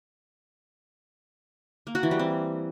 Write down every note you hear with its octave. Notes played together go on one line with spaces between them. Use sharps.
A#3
F#4
E3
G3
C4